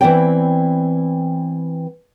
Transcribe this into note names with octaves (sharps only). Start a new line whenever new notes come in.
E3 B3 C4 E4 D5 G5